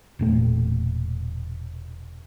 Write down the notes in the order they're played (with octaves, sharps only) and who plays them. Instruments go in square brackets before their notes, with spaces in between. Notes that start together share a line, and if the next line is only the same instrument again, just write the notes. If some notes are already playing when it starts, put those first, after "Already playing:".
[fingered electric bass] E1 A#2 A3